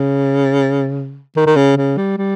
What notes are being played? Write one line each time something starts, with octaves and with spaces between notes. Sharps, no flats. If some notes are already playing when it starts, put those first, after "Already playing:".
Already playing: C#3
D#3
D#3
C#3
C#3
G3
G3